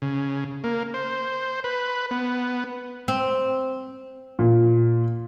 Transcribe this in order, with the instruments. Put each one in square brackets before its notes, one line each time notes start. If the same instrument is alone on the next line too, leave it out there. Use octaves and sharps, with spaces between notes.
[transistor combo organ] C#3
A#3
C5
B4
B3
[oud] C4
[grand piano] A#2